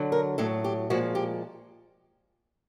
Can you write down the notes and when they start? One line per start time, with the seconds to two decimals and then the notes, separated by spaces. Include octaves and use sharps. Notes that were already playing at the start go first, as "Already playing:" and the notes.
Already playing: D3 F#3
0.12 A#4
0.38 A2 F#3 A4
0.64 G4
0.90 A#2 F3 G#3 F#4
1.15 G4